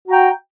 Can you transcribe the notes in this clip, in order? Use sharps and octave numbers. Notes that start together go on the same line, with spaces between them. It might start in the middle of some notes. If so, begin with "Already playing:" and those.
F#4 G5 A#5